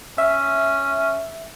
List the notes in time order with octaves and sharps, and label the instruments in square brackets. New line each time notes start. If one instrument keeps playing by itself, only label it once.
[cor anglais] C#4 [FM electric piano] E5